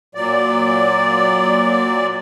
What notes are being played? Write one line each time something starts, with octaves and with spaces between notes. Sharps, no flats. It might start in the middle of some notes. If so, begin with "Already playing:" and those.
A#2 F#3 D5